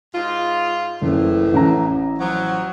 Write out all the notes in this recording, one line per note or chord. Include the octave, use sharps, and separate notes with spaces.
G#2 F4
F#1 F2 A2 E3
A1 E4 A#5
F3 F#3